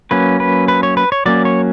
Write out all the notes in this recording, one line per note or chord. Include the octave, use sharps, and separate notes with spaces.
F#3 A#3 C#4 B4
B4
B4
C#5
B4
C#5
F#3 A#3 C#4 D5
C#5